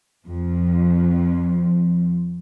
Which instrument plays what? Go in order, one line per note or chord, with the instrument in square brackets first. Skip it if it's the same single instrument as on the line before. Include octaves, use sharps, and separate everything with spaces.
[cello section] F2 F3